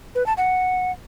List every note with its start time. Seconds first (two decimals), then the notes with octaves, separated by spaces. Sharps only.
0.15 B4
0.26 A5
0.37 F#5